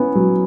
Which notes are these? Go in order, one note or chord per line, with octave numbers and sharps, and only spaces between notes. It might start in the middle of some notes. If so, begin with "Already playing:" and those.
Already playing: B3 C#4 E4
F#3